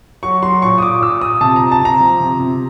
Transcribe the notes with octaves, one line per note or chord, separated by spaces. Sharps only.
F#3 C#6
F#3 C6
A#2 C#6
D#6
A#2 D6
A#2 E6
A#2 D#6
C3 A5
C3 A#5
A5
C3 A#5
F3
C3
C3